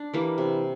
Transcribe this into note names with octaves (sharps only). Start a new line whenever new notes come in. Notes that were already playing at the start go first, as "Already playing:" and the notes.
Already playing: D4
E3 G3 A#3
C3